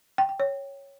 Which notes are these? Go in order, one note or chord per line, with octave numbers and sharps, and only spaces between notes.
G5
G5
C#5